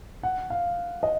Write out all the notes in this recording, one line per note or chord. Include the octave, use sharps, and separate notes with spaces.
F#5
F5
D#5